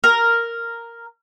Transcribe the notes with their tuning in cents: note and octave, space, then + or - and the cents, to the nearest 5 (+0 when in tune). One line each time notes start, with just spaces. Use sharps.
A#4 -5